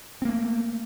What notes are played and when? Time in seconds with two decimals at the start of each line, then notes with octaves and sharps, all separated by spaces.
0.22 C4
0.25 A#3
0.29 A3